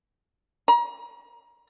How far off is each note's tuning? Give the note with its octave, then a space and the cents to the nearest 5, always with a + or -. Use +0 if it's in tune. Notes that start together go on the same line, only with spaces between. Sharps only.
A#5 +35